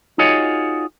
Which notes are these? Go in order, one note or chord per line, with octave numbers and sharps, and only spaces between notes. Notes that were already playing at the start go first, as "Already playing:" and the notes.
D#4 F4 F#4 G#4 C#5 D#5